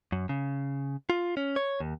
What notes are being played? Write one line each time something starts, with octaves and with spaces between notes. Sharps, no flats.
F#2
C#3
F4
C#4
C#5
D#2